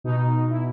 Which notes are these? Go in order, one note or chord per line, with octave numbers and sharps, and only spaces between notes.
B2 D#4
E4